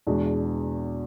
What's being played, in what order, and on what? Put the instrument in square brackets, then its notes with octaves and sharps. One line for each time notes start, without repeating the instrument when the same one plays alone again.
[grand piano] E2 B2 G#3 D4 F#4